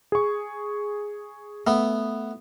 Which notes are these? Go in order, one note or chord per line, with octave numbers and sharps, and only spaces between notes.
G#4 C#6
A3 B3